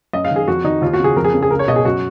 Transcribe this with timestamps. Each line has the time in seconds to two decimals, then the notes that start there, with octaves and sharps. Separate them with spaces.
0.13 F#2 D#5
0.25 F5
0.31 D#3
0.36 G#4
0.48 F2 F#4
0.64 D#3 D#4
0.82 D#2 F4
0.93 F#4
0.99 C#3
1.04 G#4
1.16 F2 A#4
1.24 G#4
1.34 C#3
1.42 G#4
1.51 C#2 A#4
1.59 C#5
1.68 B2 D#5
1.76 G#4
1.85 F#2 F#4